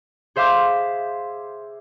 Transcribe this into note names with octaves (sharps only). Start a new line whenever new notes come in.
G#4 C5 E5 F5 D6